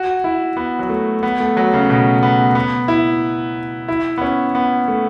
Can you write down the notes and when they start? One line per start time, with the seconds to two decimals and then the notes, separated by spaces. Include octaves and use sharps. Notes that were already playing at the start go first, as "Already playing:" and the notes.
Already playing: F#4
0.24 E4
0.57 B3
0.79 F#3
0.90 A3
1.23 B3
1.40 A3
1.57 F#3
1.74 C#3
1.90 B2
2.23 B3
2.55 B3
2.88 E4
3.88 E4
4.18 B3
4.22 C#4
4.55 B3
4.88 A3